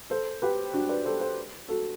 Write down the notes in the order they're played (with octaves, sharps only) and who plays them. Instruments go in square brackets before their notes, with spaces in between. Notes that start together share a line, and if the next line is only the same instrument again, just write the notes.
[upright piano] A4 C5
G4 B4
D4 F#4
B4 D5
A4 C5
A4 C5
F#4 A4